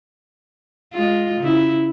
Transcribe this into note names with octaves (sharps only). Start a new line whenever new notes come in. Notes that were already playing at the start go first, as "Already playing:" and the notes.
G#3 F4
C#3 E4